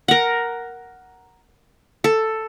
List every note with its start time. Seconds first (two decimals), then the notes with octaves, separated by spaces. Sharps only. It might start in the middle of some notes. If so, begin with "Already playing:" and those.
0.08 A#4 F#5
2.04 A4